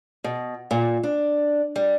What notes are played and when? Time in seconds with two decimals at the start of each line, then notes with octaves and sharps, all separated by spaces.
0.24 B2
0.71 A#2
1.03 D4
1.76 G3